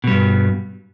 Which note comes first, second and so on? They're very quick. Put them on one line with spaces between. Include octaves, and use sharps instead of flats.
B2 G3 G2